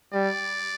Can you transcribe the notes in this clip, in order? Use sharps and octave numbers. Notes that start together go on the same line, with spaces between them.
G3 D5